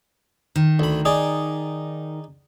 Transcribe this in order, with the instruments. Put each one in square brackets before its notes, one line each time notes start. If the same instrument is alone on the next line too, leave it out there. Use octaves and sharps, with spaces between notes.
[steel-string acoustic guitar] D#3
[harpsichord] D2 B5
D#4 G#4 D5